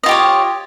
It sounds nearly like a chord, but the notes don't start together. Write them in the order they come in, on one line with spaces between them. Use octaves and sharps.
D#5 F4 G4 C#5